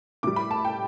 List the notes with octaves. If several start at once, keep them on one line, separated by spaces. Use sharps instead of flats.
A2 G3 D6
B5
A5
G5